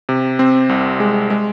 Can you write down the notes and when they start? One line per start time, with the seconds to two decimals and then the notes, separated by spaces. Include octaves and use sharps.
0.09 C3
0.39 C4
0.69 C2
1.00 G#3
1.30 G#3